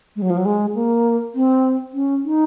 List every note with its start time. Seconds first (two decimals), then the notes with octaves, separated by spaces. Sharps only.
0.16 G#3
0.22 F#3
0.30 F3
0.37 F#3
0.45 G#3
0.75 A#3
1.35 C4
1.94 C#4
2.25 D#4